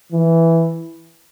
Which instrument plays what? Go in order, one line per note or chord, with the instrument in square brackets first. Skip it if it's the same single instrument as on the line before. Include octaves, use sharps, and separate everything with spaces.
[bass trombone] E3